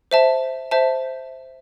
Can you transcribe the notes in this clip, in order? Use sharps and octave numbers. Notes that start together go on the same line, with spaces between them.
C5 E5 A5
C5 E5 A5